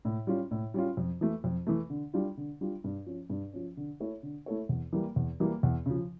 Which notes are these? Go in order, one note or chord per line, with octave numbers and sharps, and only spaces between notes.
A2
G3 C#4 F4
A2
G3 C#4 F4
F2
E3 A3
F2
E3 A3
D3
G3 D4 F4
D3
G3 D4 F4
G2
F3 C#4
G2
F3 C#4
D3
A3 E4 A4 C#5
D3
A3 E4 A4 C#5
E2
E3 G3 A#3
E2
E3 G3 A#3
E2
C#3 F3